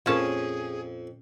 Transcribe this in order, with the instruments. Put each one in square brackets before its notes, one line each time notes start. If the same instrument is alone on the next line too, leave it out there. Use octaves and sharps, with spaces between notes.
[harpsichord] F2 [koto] A#2 C#4 A5 [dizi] G#4